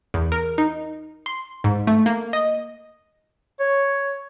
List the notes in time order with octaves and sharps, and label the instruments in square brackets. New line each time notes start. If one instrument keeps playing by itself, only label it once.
[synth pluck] E2
A#4
D#4
C6
G#2
A3
A#3
D#5
[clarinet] C#5